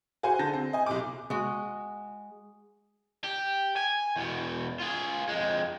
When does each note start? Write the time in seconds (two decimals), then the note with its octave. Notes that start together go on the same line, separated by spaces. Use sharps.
0.23 F#4 G#4 C5 G#5 C6
0.39 D3 A5 G6 A#6
0.54 C4
0.73 D#5 G#5
0.86 B1 C3 D6
1.30 G#3 F#4
3.24 G4
3.77 G#5
4.16 E2 B2
4.80 F4 G#4
5.29 F2 G#3